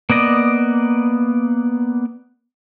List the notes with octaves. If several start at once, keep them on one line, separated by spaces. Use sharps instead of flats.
A#3 B3 D5 D#5